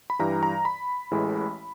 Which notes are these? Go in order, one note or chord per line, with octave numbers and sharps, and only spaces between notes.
B5
G2 E3 G3 A#5
A#5
B5
A1 A2 E3 G#3